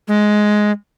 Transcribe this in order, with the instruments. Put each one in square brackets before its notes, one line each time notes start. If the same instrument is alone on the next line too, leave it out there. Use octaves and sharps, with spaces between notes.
[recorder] G#3